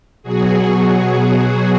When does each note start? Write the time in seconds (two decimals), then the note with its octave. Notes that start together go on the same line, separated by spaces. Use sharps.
0.23 B2 F#3 F#4 G#4